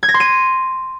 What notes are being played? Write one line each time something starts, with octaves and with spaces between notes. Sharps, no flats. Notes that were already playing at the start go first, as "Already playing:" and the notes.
G#6
A#6
C6
D#7